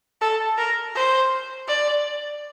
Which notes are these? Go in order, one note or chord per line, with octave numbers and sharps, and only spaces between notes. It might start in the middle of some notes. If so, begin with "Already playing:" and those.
A4
A#4
C5
D5